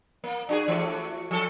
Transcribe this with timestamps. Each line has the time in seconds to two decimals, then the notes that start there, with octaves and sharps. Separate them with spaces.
0.24 A#3
0.49 D4 F#4 G#4
0.68 E3 A3 F#4
1.31 F3 A4